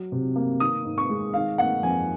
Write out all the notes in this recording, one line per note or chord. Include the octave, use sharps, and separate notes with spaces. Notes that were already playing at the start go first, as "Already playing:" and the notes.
Already playing: F#3
C3
A#3
D#3 D#6
G#2
C#6
G#3
D#3 F5
A#3 F#5
F2 G#5